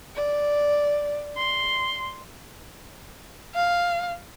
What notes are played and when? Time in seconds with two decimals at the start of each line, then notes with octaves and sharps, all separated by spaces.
0.15 D5
1.37 C6
3.54 F5